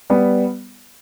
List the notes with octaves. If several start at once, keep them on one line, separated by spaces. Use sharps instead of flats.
G3 B3